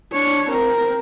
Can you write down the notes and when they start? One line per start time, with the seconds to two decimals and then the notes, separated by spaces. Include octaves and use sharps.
0.12 D4 C#5
0.49 C4 A#4